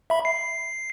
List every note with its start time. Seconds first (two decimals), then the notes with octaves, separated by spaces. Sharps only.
0.10 E5 B5
0.25 C7